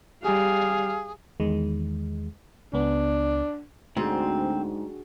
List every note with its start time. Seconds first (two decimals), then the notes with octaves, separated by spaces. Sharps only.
0.23 G3 G#4 F5
1.40 E2 D#3 G#3
2.74 C#2 B3 D4
3.97 D2 G#2 C4 D4 F#4 G#4